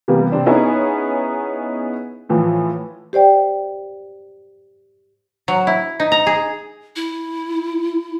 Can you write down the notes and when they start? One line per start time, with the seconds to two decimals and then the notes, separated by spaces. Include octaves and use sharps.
0.08 C3 E3 G3 A#3 B3
0.32 C3 C4 D4
0.46 B3 C#4 D#4 E4 G#4
2.29 A2 E3 F3
3.13 G4 C5 D5 G5
5.48 F#3
5.67 E4
6.00 D#4
6.12 A#5
6.27 G#4
6.96 E4